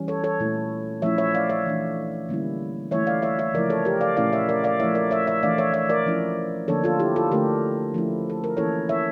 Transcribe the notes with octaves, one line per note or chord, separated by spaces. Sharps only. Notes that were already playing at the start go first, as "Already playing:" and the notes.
Already playing: E3 G3 C#4
A4 C#5
A4 C#5
A#2 A3 E4
F3 A3 C#4 E4 C#5 E5
C#5 E5
D5 F5
C#5 E5
E3 A3 D4
D3 G3 A#3 C#4 E4
E3 A3 E4 C#5 E5
D5 F5
C#5 E5
C#5 E5
C#3 F3 A3 E4 A#4 D5
A4 C#5
G4 A#4
D5 F5
A#2 A3 C#4 E4 D5 F5
C#5 E5
A#4 D5
D5 F5
F3 A3 E4 C#5 E5
A#4 D5
C#5 E5
C#5 E5
E3 A3 D4 D5 F5
C#5 E5
C#5 E5
A#4 D5
F3 C#4 E4
D3 F3 A#3 D4 A4 C#5
F4 A4
E4 G4
F4 A4
D3 A3 D4 G4 A#4
F3 A3 C#4 E4
A4
A#4
E3 A#3 C#4 E4 A4 C#5
C#5 E5